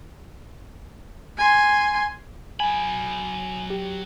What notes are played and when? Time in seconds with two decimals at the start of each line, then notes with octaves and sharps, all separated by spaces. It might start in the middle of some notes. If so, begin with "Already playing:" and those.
1.38 G#5 C6
2.60 F#3 G#5 B5
3.70 G4